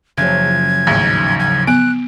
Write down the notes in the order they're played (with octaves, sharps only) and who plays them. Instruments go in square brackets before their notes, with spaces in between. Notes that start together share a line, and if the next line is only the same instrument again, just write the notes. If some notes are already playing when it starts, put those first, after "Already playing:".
[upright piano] F#1 [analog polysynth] C#3 F3 F#3 [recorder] G#6
[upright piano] A1 D#2 G#2
[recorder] G#6
[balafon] B3 [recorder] F#6 [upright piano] D7